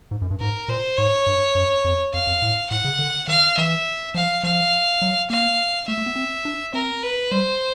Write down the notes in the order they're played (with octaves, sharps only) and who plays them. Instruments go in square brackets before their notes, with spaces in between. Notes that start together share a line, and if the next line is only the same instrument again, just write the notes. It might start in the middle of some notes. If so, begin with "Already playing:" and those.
[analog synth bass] G#2
F#2
G2
[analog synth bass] G#2 [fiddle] A#4
[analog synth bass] A#2 [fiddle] C5
[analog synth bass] G#2 [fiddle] C#5
[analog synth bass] G2
F#2
F2
[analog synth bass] F2 [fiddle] F5
[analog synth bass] F2
A2
[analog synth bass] A2 [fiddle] F#5
[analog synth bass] C#3
D3
[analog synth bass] D#3 [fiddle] F5
[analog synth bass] E3 [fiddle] E5
[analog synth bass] F3 [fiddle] F5
[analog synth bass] F3 [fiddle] F5
[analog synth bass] F#3
[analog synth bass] A#3 [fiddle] F5
[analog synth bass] A3 [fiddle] E5
[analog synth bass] A3
B3
C4
D4
[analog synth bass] C4 [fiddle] A#4
[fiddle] B4
[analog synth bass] G3 [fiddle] C5